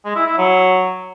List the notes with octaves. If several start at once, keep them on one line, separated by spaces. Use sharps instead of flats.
G#3
E4
E4
F#3